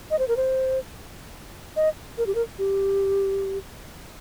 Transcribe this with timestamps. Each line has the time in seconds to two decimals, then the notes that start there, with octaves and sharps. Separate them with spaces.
0.11 D#5
0.19 C5
0.28 A#4
0.37 C5
1.76 D#5
2.18 A#4
2.27 G4
2.35 A#4
2.59 G4